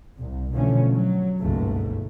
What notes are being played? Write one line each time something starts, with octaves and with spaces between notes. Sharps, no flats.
C2
B2 D3 E3 F3 A3 C#4
F#3
G1 C#2 G#2 B2 A3 A#3